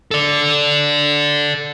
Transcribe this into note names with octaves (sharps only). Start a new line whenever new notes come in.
A4 D5